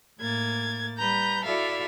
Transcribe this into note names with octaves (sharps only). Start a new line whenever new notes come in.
A2 A#3 G#6 A6
G3 B4 A#5 G6
E4 F#4 A4 D5 E5 F5